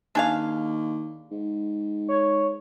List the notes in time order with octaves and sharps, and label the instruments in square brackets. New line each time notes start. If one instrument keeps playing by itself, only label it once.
[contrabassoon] D#2 [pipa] D4 G#4 F5
[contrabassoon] G#2
[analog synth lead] C#5